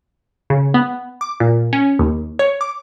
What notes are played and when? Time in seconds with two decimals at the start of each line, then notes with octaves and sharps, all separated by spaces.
0.50 C#3
0.74 B3
1.21 D6
1.40 A#2
1.73 C#4
1.99 D#2
2.39 C#5
2.61 D6